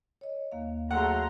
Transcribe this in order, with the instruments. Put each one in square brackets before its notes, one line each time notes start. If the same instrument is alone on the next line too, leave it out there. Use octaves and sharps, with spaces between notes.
[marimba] C#5 D#5
D#2 A#3 F5
[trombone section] F#3 A3 [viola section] G#4 A#5 C6 [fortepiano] F#5